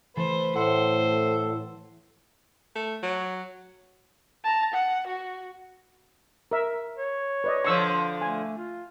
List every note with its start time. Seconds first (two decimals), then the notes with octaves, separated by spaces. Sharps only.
0.16 E3 A3 B4 C5
0.55 A2 A4 C5 F#5 C6
2.76 A3
3.03 F#3
4.44 A5 A#5
4.74 F#5
5.07 F#4
6.51 A#4 E5
6.98 C#5
7.44 B4 D5 D#5
7.64 D3 F3 C#6 E6
8.22 A3 G#5
8.58 F4